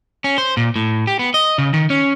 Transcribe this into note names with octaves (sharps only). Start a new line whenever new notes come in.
C#4
C5
A#2
A2
G4
B3
D#5
C#3
D#3
C#4